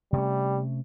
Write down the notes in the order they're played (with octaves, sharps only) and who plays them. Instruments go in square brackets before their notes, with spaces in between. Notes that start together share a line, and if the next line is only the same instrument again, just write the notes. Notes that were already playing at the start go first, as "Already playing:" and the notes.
[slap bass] C3 A3 C#4 [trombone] G3